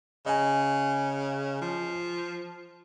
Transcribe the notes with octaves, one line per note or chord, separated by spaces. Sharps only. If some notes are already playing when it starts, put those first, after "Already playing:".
C#3 D#5 G#5
F3